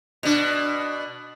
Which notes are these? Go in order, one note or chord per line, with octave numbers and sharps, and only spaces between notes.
B2 D4